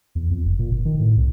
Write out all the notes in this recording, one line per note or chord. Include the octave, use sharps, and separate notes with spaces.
E2
F2
F#1
A#2
G1
D#3
A2
C2